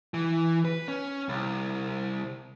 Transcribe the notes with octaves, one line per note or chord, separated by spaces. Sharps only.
E3
B4
C#4
C2